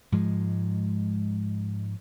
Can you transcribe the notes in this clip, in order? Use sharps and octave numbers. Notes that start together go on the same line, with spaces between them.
G#2 F3 G#3